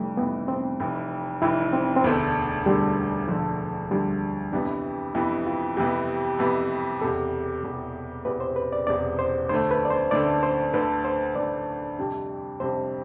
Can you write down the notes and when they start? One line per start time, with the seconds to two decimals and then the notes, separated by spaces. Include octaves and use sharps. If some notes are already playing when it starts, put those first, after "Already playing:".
Already playing: F1 F2 E3 G3 A3
0.17 F1 F2 E3 B3
0.48 C4
0.80 F1 F2 E3
1.42 F1 F2 E3 E4
1.73 C4
1.96 C4
2.04 E1 D2 D3 A3 B3
2.66 E1 D2 D3 G3 A3
3.28 E1 D2 D3 F3 A3
3.90 E1 D2 D3 G3 A3
4.53 F2 C3 E3 B3 D4
5.15 F2 C3 E3 B3 E4
5.46 F4
5.77 F2 C3 E3 B3 G4
6.39 F2 C3 E3 B3
7.01 E1 E2 C3 A4
7.63 E1 E2 C3
8.25 E1 E2 C3 B4
8.40 C5
8.56 B4
8.73 D5
8.87 E1 E2 C3 D5
9.19 C5
9.49 D2 D3 A3 C5
9.71 B4
9.85 D5
9.90 C5
10.11 D2 D3 A3 D5
10.43 C5
10.74 D2 D3 A3 B4
11.05 C5
11.35 D2 D3 A3 D5
11.98 F2 C3 G3 D4
12.60 F2 C3 G3 D4 C5